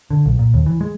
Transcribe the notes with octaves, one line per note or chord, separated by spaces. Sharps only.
D3
B1
A#2
D#2
E3
G#3